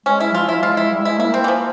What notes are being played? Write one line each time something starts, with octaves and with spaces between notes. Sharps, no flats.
G#3 C#4
E4
F3 F4
F3 E4
G#3 F4
E4
G3
G#3 E4
A#3 E4
C4
E3
F3